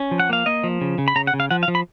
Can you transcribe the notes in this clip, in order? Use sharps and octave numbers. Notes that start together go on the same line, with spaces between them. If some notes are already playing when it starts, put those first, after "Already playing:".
Already playing: C#4
F3
F#5
A#3 F5
A#3 D#5
F3
C#3
C#3
B5
C#3 A#5
F#5
C#3
F5
F3 F#5
F5
F3
B5